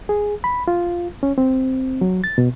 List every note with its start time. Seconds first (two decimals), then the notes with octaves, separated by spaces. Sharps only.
0.09 G#4
0.44 B5
0.68 F4
1.23 C#4
1.38 C4
2.01 F#3
2.24 A6
2.38 B2